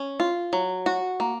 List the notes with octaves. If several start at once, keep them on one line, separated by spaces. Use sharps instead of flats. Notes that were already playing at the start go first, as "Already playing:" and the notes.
Already playing: C#4
F4
F#3
F#4
A#3